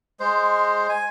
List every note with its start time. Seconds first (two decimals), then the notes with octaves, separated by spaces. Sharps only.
0.20 G#3 C5
0.89 G#5